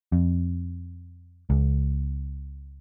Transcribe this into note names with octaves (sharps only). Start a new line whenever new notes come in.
F2
C#2